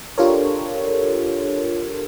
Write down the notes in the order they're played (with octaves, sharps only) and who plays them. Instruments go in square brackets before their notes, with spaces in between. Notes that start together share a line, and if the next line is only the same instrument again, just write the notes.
[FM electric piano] D4 F4 G4 A4 A#4 C#5